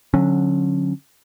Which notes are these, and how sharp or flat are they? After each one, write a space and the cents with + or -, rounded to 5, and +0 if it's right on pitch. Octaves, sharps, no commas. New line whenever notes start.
D3 +0 F#3 -25 C#4 -25